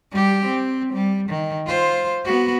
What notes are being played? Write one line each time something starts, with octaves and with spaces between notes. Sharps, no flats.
G3 G4
C4
G3
D#3
F4 C5
B3 F#4